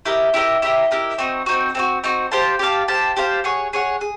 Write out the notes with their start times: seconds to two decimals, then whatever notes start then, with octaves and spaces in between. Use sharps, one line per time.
0.06 E4 G4 A#4 D#5
0.34 E4 G4 A#4 D#5
0.62 E4 G4 A#4 D#5
0.91 E4 G4 A#4 D#5
1.18 C4 D#4 F#4
1.46 C4 D#4 F#4
1.75 C4 D#4 F#4
2.04 C4 D#4 F#4
2.32 G4 C5 F5 A5
2.59 G4 C5 F5 A5
2.88 G4 C5 F5 A5
3.17 G4 C5 F5 A5
3.44 G#4 C#5 F#5
3.73 G#4 C#5 F#5
4.01 G#4